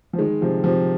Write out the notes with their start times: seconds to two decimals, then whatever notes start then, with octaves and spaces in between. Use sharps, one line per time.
0.13 F3
0.19 D#3 G#3
0.41 C3 F3
0.64 C3 F3